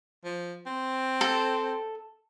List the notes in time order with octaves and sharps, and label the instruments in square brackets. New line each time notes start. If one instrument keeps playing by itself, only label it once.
[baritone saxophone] F3
C4
[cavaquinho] A4